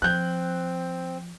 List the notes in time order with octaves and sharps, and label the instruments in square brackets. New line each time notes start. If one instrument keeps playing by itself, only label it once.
[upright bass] F3 [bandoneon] C4 [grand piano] F#6 G6